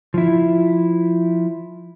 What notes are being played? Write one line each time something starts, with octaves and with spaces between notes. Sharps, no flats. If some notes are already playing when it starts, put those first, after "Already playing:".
F3 E4